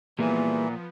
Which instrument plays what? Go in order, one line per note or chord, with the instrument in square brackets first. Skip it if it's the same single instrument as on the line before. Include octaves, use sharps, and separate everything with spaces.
[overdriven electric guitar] A#2 [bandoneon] E3 [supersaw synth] F3 B3 [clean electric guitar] G3 A#3 G#4